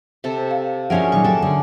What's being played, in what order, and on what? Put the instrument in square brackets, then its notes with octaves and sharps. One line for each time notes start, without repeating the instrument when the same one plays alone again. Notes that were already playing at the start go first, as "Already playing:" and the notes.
[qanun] C3 A4
[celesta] F5
[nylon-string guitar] F3 D4 F#4 [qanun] C#4 G#4 A#4 [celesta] E5 F#5
[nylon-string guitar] A#2 D#3 F#3 [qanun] C#6
[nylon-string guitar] F#4 G4 [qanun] A4
[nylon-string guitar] D3 [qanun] G#4